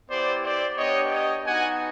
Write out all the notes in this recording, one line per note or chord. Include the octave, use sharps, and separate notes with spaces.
B3 E4 G4 C5 D5
C5 D5
B3 D4 G4 C#5 D#5
C#5 D#5
B3 D#4 F#4 F#5 G#5